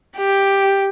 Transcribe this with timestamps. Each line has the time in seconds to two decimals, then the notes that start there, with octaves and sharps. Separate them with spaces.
0.17 G4